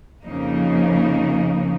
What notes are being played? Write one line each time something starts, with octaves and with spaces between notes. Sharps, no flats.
F2 C#3 F3 A#3 D#4